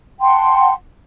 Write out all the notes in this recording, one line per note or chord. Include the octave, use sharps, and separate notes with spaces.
F#5 G5 A5 C6